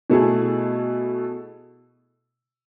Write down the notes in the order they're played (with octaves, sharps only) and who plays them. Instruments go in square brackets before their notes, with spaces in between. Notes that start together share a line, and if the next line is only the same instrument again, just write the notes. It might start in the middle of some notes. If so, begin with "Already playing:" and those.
[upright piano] B2 A3 E4 G#4